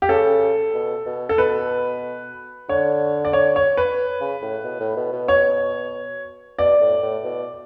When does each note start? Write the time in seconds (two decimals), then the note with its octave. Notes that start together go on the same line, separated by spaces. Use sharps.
0.02 G4
0.09 C#3 A4
0.74 B2
1.06 B2
1.29 A4
1.38 B2 B4
2.69 D3 C#5
3.25 D5
3.33 C#5
3.56 C#5
3.77 B4
4.21 C#3
4.42 A2
4.64 B2
4.80 A2
4.96 B2
5.12 B2
5.28 C#5
6.59 B2 D5
6.80 A2
7.02 A2
7.24 B2